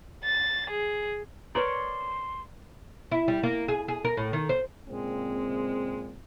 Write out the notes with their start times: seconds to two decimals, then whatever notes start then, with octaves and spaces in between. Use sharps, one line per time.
0.24 A6
0.71 G#4
1.55 A#4 B4 C#5 D5 A#5 C6
3.12 E4
3.28 G3
3.43 A#3
3.68 G#4
3.88 G#4
4.05 A#4
4.17 A2
4.33 D#3
4.49 C5
4.87 A#2 C#3 G#3 C4